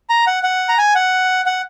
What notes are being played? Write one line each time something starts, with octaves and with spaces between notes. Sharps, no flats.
A#5
F#5
F#5
A#5
G#5
F#5
F#5